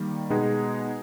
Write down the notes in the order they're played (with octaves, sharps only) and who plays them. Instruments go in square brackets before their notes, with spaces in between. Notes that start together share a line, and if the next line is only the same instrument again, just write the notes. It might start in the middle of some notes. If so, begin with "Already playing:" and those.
Already playing: [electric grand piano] D#3 G3 A#3
B2 G#3 B3 D#4 G#4